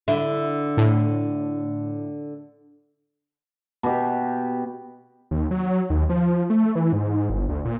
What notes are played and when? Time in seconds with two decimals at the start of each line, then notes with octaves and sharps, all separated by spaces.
0.08 D3 E4
0.77 A2
3.83 B2 G4
5.31 D#2
5.51 F#3
5.90 D#2
6.09 F3
6.50 A3
6.75 E3
6.93 G#2
7.30 G1
7.49 D2
7.65 A#2